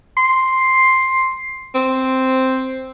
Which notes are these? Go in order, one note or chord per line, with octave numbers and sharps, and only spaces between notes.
C6
C4